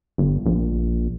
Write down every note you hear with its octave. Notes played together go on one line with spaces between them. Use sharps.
G1
A#1